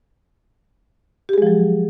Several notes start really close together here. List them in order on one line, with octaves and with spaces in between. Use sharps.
G4 G#4 G#3 F3 F#3